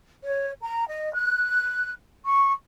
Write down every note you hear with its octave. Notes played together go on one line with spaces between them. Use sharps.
C#5
A#5
D#5
F#6
C#6